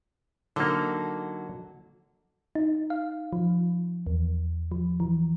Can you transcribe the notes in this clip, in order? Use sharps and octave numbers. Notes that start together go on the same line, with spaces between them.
D3 F#3 A#3 D#4 A4
D#4
F5
F3
E2
F3
E3